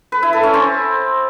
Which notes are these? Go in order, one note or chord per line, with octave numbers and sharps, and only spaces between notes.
B4
E4
A4
C#4
C4